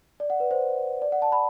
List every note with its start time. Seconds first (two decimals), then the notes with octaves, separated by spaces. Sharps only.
0.20 D5
0.30 F#5
0.40 B4
0.51 C5
1.02 D5
1.12 F#5
1.22 A5
1.32 B5